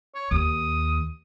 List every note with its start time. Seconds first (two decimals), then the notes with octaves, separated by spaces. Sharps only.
0.15 C#5
0.31 D#2 D#6